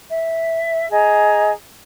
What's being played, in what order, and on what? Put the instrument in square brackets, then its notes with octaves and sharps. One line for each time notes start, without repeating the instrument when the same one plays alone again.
[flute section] E5
G#4 D#5 A#5